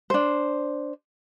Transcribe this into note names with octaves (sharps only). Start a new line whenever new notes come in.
D4 C5